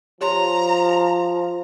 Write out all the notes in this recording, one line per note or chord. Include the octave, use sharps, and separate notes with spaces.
F3 G4 C#5 A#5 C6